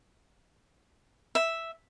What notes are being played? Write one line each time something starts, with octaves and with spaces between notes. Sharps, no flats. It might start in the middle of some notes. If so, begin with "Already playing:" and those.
E5